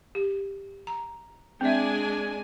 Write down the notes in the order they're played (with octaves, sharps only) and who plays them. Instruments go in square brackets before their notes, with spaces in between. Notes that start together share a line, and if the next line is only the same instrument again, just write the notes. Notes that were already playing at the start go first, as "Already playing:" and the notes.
[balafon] G4
A#5
[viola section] G#3 D4 G#5 [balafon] C4 E5